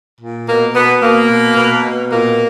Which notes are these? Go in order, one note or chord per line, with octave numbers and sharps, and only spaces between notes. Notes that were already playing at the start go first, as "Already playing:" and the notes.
A#2
B2 A#3
B2 B3
B2 A#3
B2
B2
B2
A#2 A#3